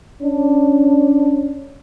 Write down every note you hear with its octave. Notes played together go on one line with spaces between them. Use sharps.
C#4 D4